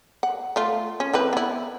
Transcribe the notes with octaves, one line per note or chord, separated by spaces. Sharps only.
F#5
A3 F4
C#4
E3 C4 B4
B3 E4